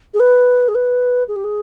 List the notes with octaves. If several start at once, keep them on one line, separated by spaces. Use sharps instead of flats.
G#4
B4
G#4
B4
G#4
G4
G#4